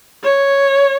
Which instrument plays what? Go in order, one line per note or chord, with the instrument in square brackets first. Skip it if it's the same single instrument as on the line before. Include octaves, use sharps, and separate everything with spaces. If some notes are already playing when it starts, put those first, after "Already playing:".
[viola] C#5